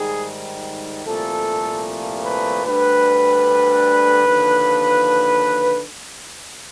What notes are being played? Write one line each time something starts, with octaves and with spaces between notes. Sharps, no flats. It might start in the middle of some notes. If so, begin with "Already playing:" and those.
Already playing: G#2 D#3 G3 G#4
C2 A#2 F3 A3 A4
B4
D2 D3 G3 B4
D#2 D3 F3